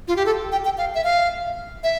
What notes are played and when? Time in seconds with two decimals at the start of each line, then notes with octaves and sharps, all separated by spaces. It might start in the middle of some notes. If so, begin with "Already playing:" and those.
0.08 F4
0.16 G4
0.26 A4
0.52 G5
0.65 G5
0.78 F5
0.95 E5
1.04 F5
1.83 E5